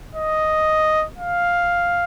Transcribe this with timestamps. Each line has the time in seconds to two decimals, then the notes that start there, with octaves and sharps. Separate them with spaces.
0.15 D#5
1.17 F5